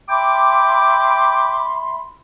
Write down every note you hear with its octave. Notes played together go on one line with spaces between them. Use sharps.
E5 G5 B5 C6 D6